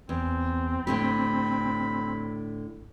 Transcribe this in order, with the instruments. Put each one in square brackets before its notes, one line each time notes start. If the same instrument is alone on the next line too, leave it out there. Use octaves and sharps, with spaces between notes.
[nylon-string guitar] E2 [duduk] C4
[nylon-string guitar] A2 D3 G4 [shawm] B5